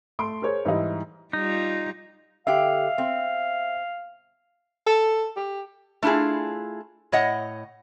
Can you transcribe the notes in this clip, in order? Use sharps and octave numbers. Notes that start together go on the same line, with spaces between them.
A3 C6 D7
G#4 A#4 C5 C#5
G#2 E3 G3 D#4 E4
G3 D#4 F4
D3 G4 E5 F5
C4
A4
G4
A3 D4 E4 F4 G#4
A2 C#5 D#5 F#5